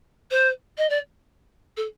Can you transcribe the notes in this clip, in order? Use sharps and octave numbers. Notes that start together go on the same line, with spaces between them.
C5
D#5
D5
A4